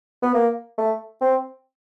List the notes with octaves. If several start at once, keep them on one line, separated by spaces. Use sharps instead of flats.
B3
A#3
A3
C4